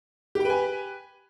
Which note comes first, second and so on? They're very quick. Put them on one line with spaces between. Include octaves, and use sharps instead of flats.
G4 G5 B4 G#5